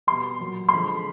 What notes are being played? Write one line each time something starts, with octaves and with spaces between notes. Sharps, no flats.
B2 G3 C6
A#2 F#3
C6
D3 F3 G#3 B5